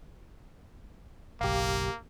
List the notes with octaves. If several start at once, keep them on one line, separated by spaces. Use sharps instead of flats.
F#1 B1 A#3 G4 F5